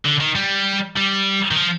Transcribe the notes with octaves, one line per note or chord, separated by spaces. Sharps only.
D3
D#3
G3
G3
D#3
F3